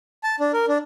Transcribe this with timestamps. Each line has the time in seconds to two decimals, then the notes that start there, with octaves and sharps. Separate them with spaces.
0.24 A5
0.40 D4
0.53 A#4
0.68 D4